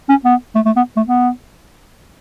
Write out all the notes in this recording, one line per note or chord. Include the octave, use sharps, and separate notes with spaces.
C#4
B3
A3
A3
B3
A3
B3